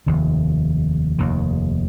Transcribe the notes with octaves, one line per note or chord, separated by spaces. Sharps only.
F1 D#2 D#3
F1 D#2 D#3